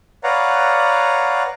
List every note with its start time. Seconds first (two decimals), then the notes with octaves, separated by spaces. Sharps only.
0.24 B4 C#5 D5 F5 F#5 A#5